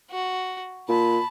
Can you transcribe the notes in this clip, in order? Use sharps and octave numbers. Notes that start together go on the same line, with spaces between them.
F#4
A#2 A5 B5